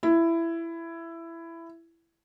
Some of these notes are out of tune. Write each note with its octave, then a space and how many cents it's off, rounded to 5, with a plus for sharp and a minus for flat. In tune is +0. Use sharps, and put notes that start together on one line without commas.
E4 +15